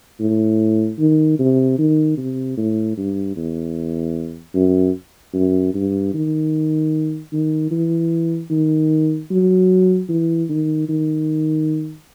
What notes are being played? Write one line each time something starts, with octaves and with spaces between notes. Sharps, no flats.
A2
D#3
C3
D#3
C3
A2
G2
E2
F#2
F#2
G2
D#3
D#3
E3
D#3
F#3
E3
D#3
D#3